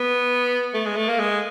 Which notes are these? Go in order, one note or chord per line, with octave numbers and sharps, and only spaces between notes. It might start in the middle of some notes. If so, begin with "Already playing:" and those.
Already playing: B3
A3
G#3
A3
A#3
G#3